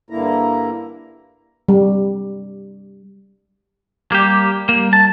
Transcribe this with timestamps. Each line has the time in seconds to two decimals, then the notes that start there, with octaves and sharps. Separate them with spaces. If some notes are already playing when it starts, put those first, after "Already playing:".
0.10 G2 D3 A#3 E4 A#5
1.68 G3
4.12 G3 A#3 G4
4.69 A#3
4.93 A5